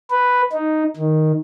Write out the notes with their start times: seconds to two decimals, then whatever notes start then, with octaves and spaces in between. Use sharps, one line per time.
0.10 B4
0.52 D#4
0.97 D#3